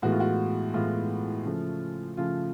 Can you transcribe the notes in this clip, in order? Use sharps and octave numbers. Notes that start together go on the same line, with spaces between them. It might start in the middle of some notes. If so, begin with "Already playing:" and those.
A2 E3 G#3 B3 F#4
F4
F#4
A2 E3 G#3 B3 F4
C#3 F3 A3
C#3 F3 A3 F4